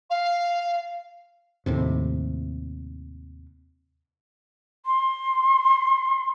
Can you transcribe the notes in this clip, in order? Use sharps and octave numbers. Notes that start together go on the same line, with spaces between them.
F5
D#2 A2 C3
C6